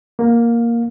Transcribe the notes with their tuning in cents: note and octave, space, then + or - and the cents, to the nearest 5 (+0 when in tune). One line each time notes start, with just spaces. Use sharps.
A#3 +0 F5 +25